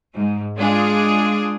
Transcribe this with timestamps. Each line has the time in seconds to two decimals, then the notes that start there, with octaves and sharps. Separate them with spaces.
0.14 G#2
0.56 G#3 D4 F4 G#4